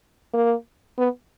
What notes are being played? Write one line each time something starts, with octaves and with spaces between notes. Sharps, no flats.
A#3
B3